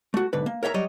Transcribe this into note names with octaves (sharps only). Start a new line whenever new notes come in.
A3 F#4
B1 G#2 D3 B4
A#3
A#4 C#5 E5 F5 A#5
F#3 G3 C#5 D#5